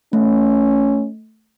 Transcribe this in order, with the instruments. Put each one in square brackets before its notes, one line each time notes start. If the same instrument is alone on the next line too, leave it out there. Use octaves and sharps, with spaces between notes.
[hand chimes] A3 [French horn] C#4